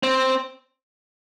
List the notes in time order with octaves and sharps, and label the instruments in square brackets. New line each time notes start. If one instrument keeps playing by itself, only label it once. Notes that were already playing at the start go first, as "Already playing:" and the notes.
[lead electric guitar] C4